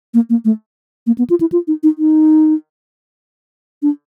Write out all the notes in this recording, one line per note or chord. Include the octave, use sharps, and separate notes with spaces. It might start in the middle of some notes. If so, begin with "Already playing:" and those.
A#3
A#3
A3
A#3
B3
F4
E4
F4
D#4
D#4
D#4
D4